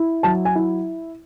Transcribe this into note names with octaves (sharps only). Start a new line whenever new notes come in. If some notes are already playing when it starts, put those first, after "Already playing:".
Already playing: E4
F#3 A5
G#5
E4